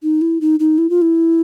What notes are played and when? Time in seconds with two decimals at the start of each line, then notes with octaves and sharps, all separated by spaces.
0.03 D#4
0.21 E4
0.41 D#4
0.60 D#4
0.78 E4
0.90 F4
1.02 E4